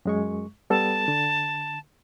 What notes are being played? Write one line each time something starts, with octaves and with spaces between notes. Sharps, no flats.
F#2 G#3 C#6
G3 B3 A4 A5
D3